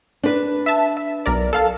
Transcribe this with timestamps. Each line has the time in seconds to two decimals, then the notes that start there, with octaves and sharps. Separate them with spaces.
0.23 D4 B4
0.66 E5 A5
0.97 E5
1.26 B1 A#4 D5
1.53 A4 F5 A5